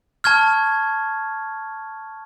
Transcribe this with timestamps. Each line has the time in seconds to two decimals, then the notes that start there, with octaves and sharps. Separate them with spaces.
0.24 A5 C#6 F6 G#6